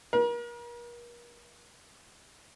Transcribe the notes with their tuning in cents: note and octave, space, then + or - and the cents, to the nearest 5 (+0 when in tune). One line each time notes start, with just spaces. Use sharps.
A#4 +40